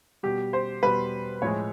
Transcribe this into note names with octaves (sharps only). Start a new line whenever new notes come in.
B2 G3 G4
C5
B2 G3 B4
A2 F3 G#3 C#5